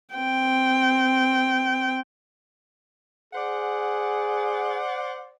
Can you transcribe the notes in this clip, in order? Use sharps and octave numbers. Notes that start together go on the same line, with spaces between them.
C4 G5
G#4 C5 D5 F#5